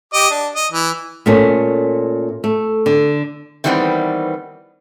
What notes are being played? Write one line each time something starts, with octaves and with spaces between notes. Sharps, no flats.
G4 D#5 D6
D4
D#5
E3
A#2 A3 C#4
A3
D3
D#3 E3 G3 B3 C4